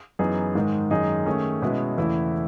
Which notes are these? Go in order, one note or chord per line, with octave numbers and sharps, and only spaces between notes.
F#2 E3 B3 D#4 G#4
G#2 D#3 G#3
F#2 D#3 G#3 D#4 G#4
D#3 A3 C#4 G#4
B2 G#3 C#4 E4 B4
E2 C#3 E3 A3 E4